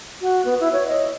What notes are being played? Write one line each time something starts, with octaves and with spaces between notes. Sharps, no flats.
F#4
B3
E4
C#5
D#5